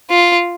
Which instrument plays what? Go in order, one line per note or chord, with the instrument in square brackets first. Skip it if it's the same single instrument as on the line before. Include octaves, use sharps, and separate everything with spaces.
[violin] F4